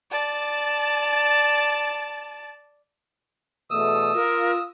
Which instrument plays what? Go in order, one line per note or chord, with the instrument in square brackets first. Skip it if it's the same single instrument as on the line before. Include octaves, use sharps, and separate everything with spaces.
[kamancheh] D5 A5
[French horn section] E2 B2 A3 [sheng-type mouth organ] D#6 E6
[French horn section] F4 [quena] A#4